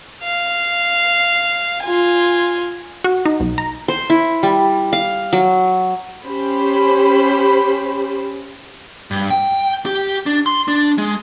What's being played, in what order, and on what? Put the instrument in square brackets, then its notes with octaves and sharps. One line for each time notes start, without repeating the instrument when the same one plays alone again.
[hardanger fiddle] F5
F4 G#5
[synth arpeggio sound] F#4
D#4
B1
A#5
[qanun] C5
E4
G3
F5
F#3
[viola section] C#4 G4 C5 B5
[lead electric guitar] G2
G5
G4
D4
C6
D4
G#3